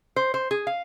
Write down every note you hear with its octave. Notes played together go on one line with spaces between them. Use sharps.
C5
C5
G#4
F5